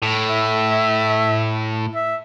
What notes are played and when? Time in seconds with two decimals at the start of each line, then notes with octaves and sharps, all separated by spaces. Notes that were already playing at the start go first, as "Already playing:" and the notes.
0.03 A2
0.29 E5
1.95 E5